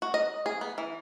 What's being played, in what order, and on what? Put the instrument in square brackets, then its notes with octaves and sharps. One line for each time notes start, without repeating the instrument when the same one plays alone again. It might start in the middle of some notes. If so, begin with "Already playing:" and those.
[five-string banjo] F#4
D#5
G#4
B3
E3